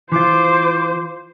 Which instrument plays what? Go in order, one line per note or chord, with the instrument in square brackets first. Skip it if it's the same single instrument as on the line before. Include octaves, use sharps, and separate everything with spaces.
[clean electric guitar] E3 F4 [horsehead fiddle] C5 [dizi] D6